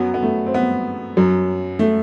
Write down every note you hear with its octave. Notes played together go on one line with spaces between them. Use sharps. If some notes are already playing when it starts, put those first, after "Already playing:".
Already playing: F#2 F#3 B3
B3
A3
C4
B3
F#2 F#3
A3